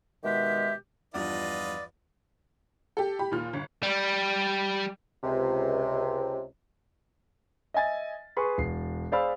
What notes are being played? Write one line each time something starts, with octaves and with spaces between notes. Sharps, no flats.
B2 D#3 G#3 G4 E5
E2 G2 F3 F4 B4 D5 D#5
G4 A4
G4 B5
D#2 A#2 F4 F6
G1
G3
C#2 C3
D#5 E5 G#5 A6
G#4 B4 C6 C#6
E1 C7
G#4 C5 D5 F5 B5 E6